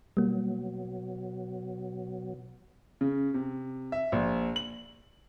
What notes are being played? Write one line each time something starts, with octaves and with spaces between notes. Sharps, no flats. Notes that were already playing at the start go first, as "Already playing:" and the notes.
B2 F#3 G3 A#3
C#3
C3
E5
A#1
F#7